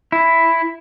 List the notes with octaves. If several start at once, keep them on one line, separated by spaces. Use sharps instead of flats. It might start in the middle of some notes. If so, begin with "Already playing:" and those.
E4